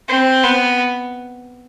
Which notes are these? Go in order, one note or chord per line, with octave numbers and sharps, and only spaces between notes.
C4
B3